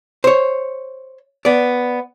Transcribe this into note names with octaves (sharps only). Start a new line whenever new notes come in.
C5 C#5
B3 D5